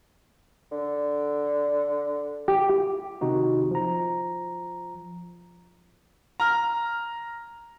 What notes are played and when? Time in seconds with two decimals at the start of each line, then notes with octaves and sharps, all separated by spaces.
0.72 D3
2.48 G4
3.21 C3 D#3 D#4 F#4
3.71 F3 A#5
6.40 A#5 F6